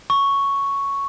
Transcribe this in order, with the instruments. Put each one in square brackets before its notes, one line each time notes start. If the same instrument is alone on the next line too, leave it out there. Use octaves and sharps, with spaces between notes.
[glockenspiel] C#6